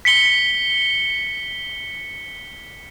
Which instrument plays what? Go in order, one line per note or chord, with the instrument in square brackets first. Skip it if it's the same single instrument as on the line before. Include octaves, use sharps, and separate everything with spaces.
[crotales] B6 C#7 G7